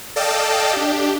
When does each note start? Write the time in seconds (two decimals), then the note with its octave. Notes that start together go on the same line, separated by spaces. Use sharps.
0.16 A4 D5 D#5 F5 G5 A5
0.73 D4 G4